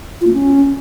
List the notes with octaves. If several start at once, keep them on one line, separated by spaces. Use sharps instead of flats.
F4
A#3
C#4